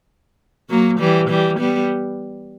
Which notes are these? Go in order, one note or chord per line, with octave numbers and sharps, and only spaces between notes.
F#3 A#3
E3 G3
E3 G3
G3 B3